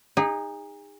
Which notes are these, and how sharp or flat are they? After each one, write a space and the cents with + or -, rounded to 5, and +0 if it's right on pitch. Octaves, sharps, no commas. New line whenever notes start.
D#4 +0 G#4 -35